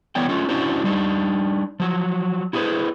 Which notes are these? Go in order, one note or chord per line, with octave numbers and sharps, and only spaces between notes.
E3 B3 C#5 D5 G5
A3 C#4 F4
C#4 D4 E4 F#4 C5
G3 D4 D#4
F3 F#3
E4 F#4 G#4 A4 B4 C5